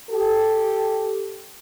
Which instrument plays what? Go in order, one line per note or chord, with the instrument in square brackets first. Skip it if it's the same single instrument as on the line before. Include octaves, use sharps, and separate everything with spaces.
[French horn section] G4 A4